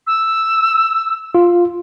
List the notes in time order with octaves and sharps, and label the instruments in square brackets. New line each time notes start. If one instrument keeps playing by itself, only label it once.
[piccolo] E6
[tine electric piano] F4